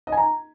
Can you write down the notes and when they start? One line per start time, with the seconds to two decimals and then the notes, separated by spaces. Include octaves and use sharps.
0.07 D#5
0.12 G#5
0.17 A#5